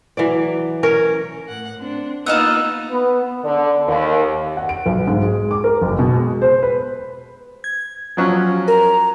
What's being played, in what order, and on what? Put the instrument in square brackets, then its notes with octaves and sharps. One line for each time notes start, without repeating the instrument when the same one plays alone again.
[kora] E3 F#3 D5
C#4 A#4 C#5
[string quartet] A2 F#5
C4 D4
[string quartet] A#3 B3 D#4 [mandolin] F4 D#5 F#5 [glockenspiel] E6 E7
[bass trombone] B3
[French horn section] D3
D#2
[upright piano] F#5
D7
B1
G#2
G#3
D6
A#4
F#1
B2
G#3
C5
B4
[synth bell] G#6
[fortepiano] F3 F#3 C#4
[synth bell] A#4 [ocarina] A#5